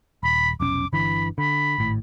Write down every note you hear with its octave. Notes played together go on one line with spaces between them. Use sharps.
D#1 B5
F1 B1 C#4 D6
G1 D3 E3 B5
D3 B5
G#1 A2